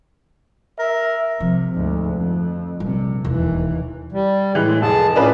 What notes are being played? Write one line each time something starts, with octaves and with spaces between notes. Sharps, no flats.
A#4 E5
C3 F3
D2 G#2
F2
A#1 C3 G3
E1 D#2 E3
G3
A2 E3 G#3
F1 G#4 A5
A2 C#4 D4 F4 B4